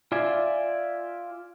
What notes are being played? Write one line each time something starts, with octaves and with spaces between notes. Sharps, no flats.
F4 D5 E5 G#5